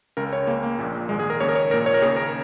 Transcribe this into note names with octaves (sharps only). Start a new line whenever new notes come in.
C#2 C#3 A#4
C#5
C#2 C#3 A#3
A#3
A#1 A#2
A#1 G#2 D#3 G#3
G#4
A#4
D#2 C#3 C#5
A#4
C#5
A#1 A#2 A#4
C#5
A#4
D#2 C#3 G#4
A#4